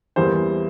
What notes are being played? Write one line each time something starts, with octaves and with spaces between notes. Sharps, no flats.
E2 E3 G3 A#3 C5